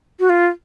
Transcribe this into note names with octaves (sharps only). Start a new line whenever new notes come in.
F#4
F4